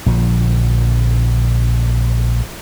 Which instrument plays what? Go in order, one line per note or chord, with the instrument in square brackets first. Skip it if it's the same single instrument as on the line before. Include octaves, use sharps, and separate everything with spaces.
[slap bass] A#1 D3 F3